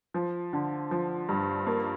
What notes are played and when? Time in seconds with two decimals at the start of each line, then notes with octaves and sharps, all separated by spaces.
0.14 F3
0.53 D3
0.91 F3
1.29 G2
1.67 A#3